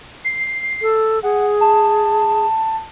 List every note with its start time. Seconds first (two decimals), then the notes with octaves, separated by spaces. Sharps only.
0.24 C7
0.82 A4
1.23 G#4 F#5
1.61 A5